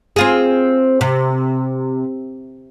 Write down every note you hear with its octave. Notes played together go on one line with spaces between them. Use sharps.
C4 F4 G#4
C3